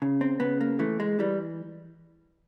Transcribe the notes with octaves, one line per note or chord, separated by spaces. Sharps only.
C#3
C4
C#3 B3
A#3
E3 A3
G#3
E3 G3